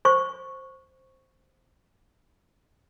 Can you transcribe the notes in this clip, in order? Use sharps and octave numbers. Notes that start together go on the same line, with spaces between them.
C5 C#6